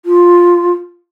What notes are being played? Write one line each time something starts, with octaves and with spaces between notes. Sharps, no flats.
F4